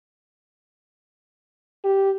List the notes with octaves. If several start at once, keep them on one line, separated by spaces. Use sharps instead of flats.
G4